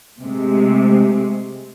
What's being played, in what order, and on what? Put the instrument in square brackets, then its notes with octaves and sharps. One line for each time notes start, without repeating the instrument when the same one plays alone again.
[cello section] C3 G#3 A3